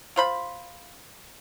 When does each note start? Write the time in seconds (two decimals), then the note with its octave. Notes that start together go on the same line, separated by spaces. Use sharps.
0.16 F4 C5 B5